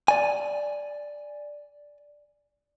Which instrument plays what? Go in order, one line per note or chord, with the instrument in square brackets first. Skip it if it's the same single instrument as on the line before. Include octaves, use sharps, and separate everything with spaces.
[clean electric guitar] D5 G#5